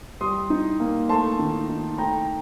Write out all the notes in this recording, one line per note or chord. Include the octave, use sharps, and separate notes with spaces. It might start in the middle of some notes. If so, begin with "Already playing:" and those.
G3 C6 D#6
D#4
A#3
A3 A5 C6
D#3
D#4
A3 G5 A#5